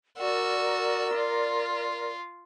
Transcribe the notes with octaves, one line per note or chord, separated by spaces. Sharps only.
F#4 A#4 D5 E6
F4